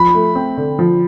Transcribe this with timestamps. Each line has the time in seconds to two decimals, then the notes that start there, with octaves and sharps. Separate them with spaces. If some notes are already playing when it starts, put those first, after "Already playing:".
Already playing: F3 B5
0.15 A3
0.35 C4
0.57 D3
0.79 F3